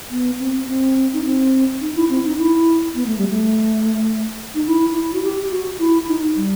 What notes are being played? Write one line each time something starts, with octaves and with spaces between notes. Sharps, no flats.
B3
C4
C4
D#4
C4
D#4
E4
C4
D#4
E4
B3
A3
G3
A3
D#4
E4
E4
F#4
G4
F#4
E4
D#4
G3